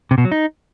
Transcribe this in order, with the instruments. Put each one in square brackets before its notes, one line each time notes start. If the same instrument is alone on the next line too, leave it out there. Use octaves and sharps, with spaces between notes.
[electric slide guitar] C3
B2
F#3
D#4